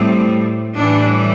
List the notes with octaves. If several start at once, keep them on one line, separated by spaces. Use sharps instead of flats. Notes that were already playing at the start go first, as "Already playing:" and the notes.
Already playing: A2 G3 C4
A2 E3 G3 D4